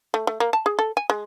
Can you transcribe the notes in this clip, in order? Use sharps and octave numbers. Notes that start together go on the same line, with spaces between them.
A3
A3
A#3
A5
G#4
A4
G#5
G#3